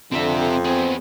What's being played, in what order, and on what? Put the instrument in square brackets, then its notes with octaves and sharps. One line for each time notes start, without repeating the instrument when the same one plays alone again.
[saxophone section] F2 [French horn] D3 [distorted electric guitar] C4 E5
[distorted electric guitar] B3 G#4 [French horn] C4